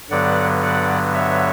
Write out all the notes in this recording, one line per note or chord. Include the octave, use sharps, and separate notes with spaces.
G2 D3 F#3 B3 D5 F#5
D5 F#5
C#5 E5